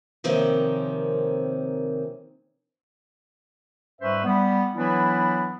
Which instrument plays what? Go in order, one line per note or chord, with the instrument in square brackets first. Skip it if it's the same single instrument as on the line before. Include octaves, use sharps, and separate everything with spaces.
[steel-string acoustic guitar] C3 D#3 F3 A#3 C4 C#4
[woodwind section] G#2 G3 C#4 B4 C5 E5
G3 B3
E3 F#3 B3 D4 E4